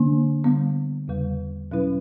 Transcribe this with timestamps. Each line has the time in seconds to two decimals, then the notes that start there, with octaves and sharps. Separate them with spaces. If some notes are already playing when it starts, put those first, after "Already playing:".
Already playing: D3 A#3 D4
0.44 D3 G3 B3
1.08 E2 C#3 G3
1.71 B2 F#3 C#4 E4 B4